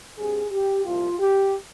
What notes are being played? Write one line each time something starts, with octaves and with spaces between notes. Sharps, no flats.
G2 G3 C4 G#4
G4
C2 A#2 F3 F4
G4